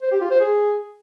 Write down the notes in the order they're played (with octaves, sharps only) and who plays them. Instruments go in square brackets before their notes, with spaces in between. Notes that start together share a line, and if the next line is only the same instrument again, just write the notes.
[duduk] C5
G4
F4
C5
G#4